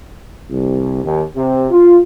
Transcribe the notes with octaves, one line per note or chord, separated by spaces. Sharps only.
C2
D#2
C3
F4